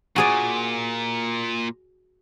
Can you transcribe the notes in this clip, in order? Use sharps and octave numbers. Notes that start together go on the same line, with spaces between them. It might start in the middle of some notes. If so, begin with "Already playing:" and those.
A#2 F#4 G#4 D5